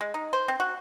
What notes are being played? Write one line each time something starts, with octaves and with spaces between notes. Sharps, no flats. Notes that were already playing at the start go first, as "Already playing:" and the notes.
G#3
D#4
C5
C4
F#4